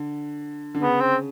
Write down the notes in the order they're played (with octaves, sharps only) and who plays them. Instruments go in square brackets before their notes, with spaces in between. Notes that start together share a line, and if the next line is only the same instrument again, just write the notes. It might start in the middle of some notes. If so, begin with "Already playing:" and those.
Already playing: [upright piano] D3
D3
[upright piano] C#3 [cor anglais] B3
[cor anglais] C4